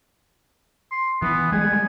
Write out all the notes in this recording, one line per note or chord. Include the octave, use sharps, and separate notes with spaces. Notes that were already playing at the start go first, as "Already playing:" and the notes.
C6
E3 B3
G3 G#3 G#5